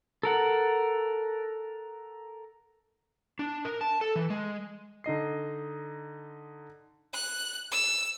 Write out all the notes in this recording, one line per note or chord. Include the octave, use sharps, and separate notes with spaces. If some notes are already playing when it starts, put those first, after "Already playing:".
A4 A#4 F#5
D4
A#4
A5
A4
E3
G#3
D3 D#4 D#5 C7
F#6
E6